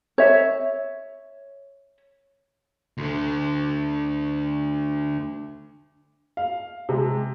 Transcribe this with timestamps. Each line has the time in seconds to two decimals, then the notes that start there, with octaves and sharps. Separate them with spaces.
0.18 C#5 E5
2.98 D2 D3
6.37 F5
6.89 C3 G#3